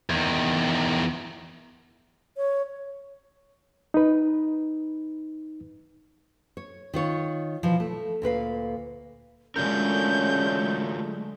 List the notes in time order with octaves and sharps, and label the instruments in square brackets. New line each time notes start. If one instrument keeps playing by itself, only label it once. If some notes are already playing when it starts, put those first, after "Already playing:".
[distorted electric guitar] E2 D#3
[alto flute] C#5
[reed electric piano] D#4 B4
[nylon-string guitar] C#5
D#3 F4 C#5
B2 E3 F3
A3
D2 A#2 B4 F5
[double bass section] D3 G#3 A3 [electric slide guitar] F#3 F4 A#4 [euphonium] C#4 [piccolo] G6